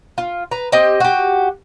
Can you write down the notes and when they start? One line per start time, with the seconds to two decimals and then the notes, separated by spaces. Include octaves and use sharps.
0.18 F4
0.51 B4 A#5
0.72 C4 G4 D#5
1.00 F#4 G4